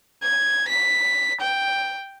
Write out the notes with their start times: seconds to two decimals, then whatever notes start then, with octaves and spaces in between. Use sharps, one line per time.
0.22 G#6
0.68 B6
1.41 G5